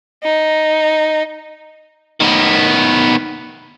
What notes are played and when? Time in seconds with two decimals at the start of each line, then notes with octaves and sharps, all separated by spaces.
0.24 D#4
2.20 D#3 B3